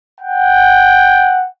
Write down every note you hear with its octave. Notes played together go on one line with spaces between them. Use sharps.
F#5 G5